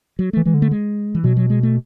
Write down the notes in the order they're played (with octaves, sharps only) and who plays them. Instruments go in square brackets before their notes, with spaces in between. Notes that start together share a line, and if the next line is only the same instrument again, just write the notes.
[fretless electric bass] F#3
[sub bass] E3 [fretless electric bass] A3
[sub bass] E3 [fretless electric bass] G#3
[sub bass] D3
[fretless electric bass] A3
G#3
E3
[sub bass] B2 [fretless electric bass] F#3
[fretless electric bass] F#3
G#3
A3